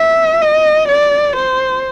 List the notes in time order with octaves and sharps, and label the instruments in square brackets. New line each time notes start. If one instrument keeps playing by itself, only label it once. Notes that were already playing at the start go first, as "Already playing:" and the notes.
Already playing: [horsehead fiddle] E5
D#5
D5
C5